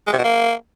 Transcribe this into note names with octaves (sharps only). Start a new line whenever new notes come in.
G#3
C3
B2
A#3